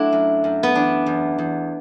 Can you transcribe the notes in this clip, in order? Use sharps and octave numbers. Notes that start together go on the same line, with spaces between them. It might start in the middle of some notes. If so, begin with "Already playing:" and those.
Already playing: F#3 A3 D4 E4 F#4
F#2
F#2
B3
E3 D4
E2
E2